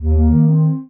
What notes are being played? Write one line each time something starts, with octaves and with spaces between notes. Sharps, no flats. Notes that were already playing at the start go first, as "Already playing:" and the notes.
Already playing: D#2
A#3
D#3
C4